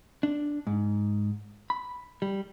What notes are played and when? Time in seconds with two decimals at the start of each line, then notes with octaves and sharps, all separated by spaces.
0.23 D4
0.67 G#2
1.70 B5
2.22 G3